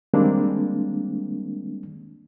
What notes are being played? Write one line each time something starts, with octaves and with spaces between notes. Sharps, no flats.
D#3 G3 G#3 A#3 C4 D4